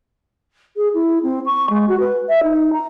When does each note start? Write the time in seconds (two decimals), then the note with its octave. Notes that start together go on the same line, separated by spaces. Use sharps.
0.76 G#4
0.94 E4
1.23 C4
1.46 C#6
1.70 G#3
1.88 F#4
2.00 B4
2.29 E5
2.43 D#4
2.72 A#5